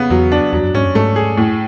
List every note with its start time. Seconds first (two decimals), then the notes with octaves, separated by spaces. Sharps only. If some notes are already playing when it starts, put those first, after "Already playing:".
Already playing: C#3 B3
0.10 E2 F#3
0.32 D4
0.53 E2 F#3
0.64 F#2
0.74 G#2 C#4
0.85 F#2
0.95 G#2 A3
1.16 G#4
1.37 A2